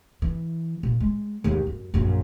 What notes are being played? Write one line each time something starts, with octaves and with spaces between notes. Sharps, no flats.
E3
A#2
G#3
D#2 G#2
F#2
A#1 F#2